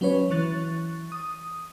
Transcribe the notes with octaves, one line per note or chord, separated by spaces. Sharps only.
F#3 C#4 B4 C#5
E3 C#6 F#6 A6
D#6